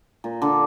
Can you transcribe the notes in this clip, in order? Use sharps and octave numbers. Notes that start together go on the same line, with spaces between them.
A#2
D3